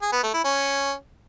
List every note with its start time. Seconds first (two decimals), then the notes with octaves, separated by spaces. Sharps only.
0.02 G#4
0.12 B3
0.23 A3
0.34 E4
0.44 C#4